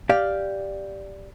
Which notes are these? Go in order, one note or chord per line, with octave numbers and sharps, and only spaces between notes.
G4 D5 F5